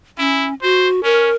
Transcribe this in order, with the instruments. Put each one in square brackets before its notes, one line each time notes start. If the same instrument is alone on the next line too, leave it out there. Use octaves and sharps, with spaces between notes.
[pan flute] C#4 [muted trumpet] E4
[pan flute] F#4 [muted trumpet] C5
[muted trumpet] C#4 [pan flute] A#4